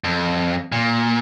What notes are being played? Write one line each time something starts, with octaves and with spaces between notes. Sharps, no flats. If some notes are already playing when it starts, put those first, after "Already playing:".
F2
A#2